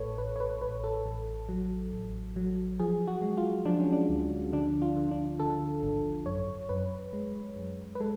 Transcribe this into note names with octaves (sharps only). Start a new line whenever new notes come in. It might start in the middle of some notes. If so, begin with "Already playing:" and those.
Already playing: A1 A2 A4 B4 C#5
A1 B4
C#5
B4
A1 B4
A4
A1
F#3
A1
F#3
F3 G#4
F#4
G#3
F4
F3 D4
C#4
D4
D2
D3 D4
F4
D3
D4
D3 A4
G#1
F#2 C#5
F#2 B4
G#3
F#2
B4
G#3 A4